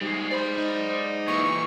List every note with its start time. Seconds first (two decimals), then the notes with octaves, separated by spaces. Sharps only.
0.01 G#2 G3 G#4
0.30 C5 D5 B5
0.58 D#4
1.28 A#2 E3 C#6